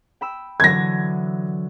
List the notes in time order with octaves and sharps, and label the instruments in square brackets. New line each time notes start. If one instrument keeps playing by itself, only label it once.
[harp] G5 B5 E6
[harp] D3 E3 F#3 [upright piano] G#6 A#6